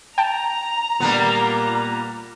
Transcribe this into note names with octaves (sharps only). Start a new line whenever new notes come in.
G5 A5 A#5
A#2 G3 A#3 B3